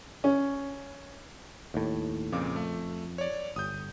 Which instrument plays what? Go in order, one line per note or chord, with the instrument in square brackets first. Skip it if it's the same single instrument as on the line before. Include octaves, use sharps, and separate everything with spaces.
[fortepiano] C#4
[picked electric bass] D#2 A2
[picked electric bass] F2 [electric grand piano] A#2 C#3 D6
[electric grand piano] A3
C#5 D5
[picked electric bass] G1 [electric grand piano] D#6 G6